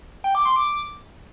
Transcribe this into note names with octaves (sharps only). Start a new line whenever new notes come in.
G5
D6
C6
D6